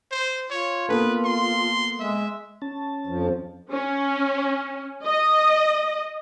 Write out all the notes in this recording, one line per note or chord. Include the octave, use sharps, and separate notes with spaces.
C5
F4 C#5
A#3 B3 A4 B4
C6
G#3 E5
C#4 A5
F2 F3
C#4
D#5